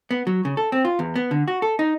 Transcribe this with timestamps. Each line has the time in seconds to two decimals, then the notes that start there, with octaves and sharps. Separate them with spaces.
0.11 B3
0.27 F#3
0.45 C#3
0.57 A4
0.72 C4
0.85 F4
0.99 E2
1.16 B3
1.31 D3
1.48 F#4
1.62 A4
1.79 D#4